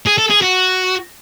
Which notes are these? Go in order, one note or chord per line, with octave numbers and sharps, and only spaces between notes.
G#4
A4
G#4
F#4